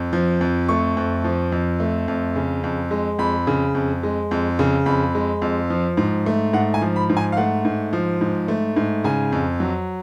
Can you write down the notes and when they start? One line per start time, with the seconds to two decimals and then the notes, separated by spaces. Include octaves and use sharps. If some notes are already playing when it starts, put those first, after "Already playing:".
Already playing: F2
0.13 F3
0.41 F2
0.68 A3 C#6
0.97 F2
1.24 F3
1.52 F2
1.80 A3
2.08 F2
2.36 C#3
2.64 F2
2.91 G#3
3.19 F2 B5
3.47 C#3
3.75 F2
4.03 G#3
4.31 F2
4.59 C#3
4.86 F2 B5
5.15 G#3
5.42 F2
5.70 F3
5.97 G#2
6.26 A3
6.53 G#2 F#5
6.74 G#5
6.82 F3
6.96 B5
7.09 G#2
7.17 G#5
7.32 F5
7.37 A3 F#5
7.65 G#2
7.93 F3
8.21 G#2
8.48 A3
8.76 G#2
9.04 C#3 G#5
9.32 F2
9.60 F#3